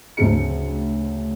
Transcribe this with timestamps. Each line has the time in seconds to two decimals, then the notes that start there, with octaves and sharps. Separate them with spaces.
0.17 D2 C#3 F#3 A3 C4 C#7